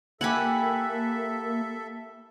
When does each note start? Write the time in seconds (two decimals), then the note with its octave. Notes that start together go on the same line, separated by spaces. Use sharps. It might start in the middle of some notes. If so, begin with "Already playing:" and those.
0.21 A#3 E4 G4 A4 E5 F#5 G#5 B5